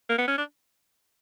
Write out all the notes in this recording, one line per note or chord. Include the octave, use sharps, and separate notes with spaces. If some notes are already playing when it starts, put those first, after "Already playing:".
A#3
B3
C#4
D4